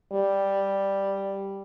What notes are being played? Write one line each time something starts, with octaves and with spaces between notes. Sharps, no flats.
G3